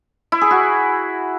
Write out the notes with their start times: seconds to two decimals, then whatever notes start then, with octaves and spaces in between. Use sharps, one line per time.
0.32 E4
0.41 G#4
0.51 F#4